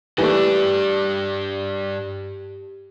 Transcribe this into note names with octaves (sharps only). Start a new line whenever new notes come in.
G2 E3 A3 D4 G4